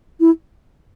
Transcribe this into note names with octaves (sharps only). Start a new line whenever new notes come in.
E4